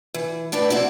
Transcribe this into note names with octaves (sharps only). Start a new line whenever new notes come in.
E3
A2 D4 B4 D5
C4 E4 F#4 D5